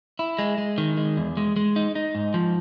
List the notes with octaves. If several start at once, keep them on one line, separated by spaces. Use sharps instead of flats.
E4
G#3
G#3
D#3
G#3
E2
G#3
G#3
D#4
D#4
G#2
F3